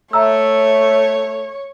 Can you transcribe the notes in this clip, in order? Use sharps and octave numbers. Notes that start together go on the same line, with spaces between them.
A3 C#5 E5 A#5 E6